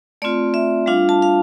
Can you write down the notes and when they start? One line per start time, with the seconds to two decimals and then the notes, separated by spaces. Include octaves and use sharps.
0.22 A3 C4 F4 D5
0.54 E5
0.86 G3 D4 F4 F5
1.09 A5
1.22 F5